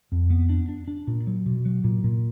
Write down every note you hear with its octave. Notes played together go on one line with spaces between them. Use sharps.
F2
B3
D4
D4
D4
A#2
F#3
B2
F#3
A#2
A#2